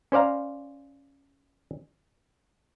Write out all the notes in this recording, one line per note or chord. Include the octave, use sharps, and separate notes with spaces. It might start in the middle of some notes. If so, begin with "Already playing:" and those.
C#4 C5 D5 F5 A#5